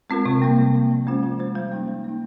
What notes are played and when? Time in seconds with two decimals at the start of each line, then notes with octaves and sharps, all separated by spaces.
0.10 G#3 C4 F4 A#4
0.26 C3
0.42 G3 A#3
0.58 C3
0.74 G3 A#3
0.90 F3
1.07 G#3 C#4 F4 C5
1.23 F3
1.39 G#3 C#4 F4 C5
1.56 G3
1.72 A#3 D#4
1.88 G3
2.04 A#3 D#4